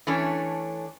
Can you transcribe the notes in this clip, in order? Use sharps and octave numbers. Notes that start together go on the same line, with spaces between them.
E3 A3 C#4 D4